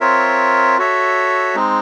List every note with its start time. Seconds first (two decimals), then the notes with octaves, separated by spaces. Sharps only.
0.01 C4 F4 A#4 C#5 E5
0.78 F#4 A4 C#5 E5
1.55 G#3 C4 D#4